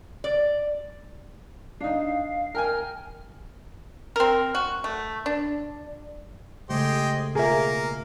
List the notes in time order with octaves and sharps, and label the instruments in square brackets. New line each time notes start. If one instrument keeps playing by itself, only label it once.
[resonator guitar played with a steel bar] D5
[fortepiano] D4 D#4 [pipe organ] F5
[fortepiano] A#4 G5 G#5 [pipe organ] F6
[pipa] C4 A#4
F#4
A3
D4
[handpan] C#3 G#3 A3 [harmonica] G4 G#4 C5 [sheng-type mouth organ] D#5
[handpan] B2 F4 [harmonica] A#3 [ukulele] G#4 E5 [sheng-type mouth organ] A#4